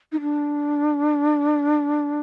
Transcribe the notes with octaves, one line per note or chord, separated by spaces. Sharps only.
D#4
D4